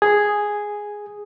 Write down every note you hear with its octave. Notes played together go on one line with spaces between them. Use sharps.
G#4